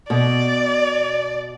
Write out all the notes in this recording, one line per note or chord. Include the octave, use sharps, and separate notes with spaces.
B2 D5